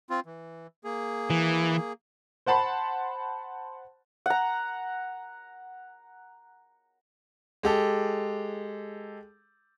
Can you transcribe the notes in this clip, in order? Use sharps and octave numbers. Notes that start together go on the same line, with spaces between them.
C4 F4
E3
A#3 G#4
E3
C5 F#5 A5 B5 C6
F#5 A#5
G#3 G4 A4